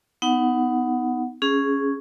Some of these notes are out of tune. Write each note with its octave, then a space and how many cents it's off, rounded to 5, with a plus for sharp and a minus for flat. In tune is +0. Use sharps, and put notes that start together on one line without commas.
B3 +15 D#4 +10 F#5 +0
C#4 +0 G#4 +0